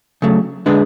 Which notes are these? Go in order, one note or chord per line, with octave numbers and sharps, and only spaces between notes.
C#3 F#3 A3
D3 G#3 D4 G#4 B4